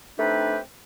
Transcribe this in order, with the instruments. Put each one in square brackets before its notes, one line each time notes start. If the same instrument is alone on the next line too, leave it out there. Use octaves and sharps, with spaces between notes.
[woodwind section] A3 C4 D4 D#4 G4 B4